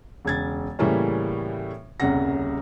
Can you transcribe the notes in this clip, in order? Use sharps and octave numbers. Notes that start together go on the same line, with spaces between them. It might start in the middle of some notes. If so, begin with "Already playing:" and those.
E1 C#3 G#6 A6
A2 C#3 E3 G3 A#3 C#4
D#1 C2 F#2 C#3 F#5 A#6